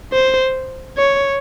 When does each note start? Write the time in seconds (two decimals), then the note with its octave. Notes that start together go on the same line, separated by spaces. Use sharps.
0.13 C5
0.97 C#5